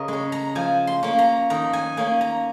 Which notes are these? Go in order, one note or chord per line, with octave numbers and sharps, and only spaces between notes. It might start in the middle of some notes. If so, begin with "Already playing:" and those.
Already playing: C#3 A#4 D#5
G#3 C#4
A#5
F3 G#5
C6
A#3 C#4
A#5
D#3 A#5
G#5
A#3 C#4 G#5
A#5